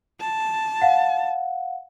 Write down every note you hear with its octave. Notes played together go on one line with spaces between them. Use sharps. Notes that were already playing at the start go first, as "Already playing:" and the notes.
A5
F5 F#5